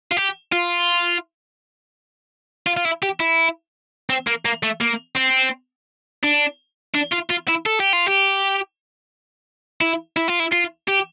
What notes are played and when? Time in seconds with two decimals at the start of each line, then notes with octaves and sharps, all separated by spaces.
0.11 F4
0.17 G4
0.52 F4
2.67 F4
2.77 F4
2.85 E4
3.03 G4
3.20 E4
4.10 C4
4.27 A#3
4.45 A#3
4.63 A3
4.81 A#3
5.17 C4
6.24 D4
6.95 D4
7.13 F4
7.30 F4
7.49 E4
7.66 A4
7.80 G4
7.93 F4
8.07 G4
9.81 E4
10.17 E4
10.28 F4
10.40 E4
10.52 F4
10.88 G4